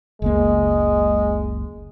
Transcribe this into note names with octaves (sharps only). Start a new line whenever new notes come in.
F#1 C#2 G#3 A#3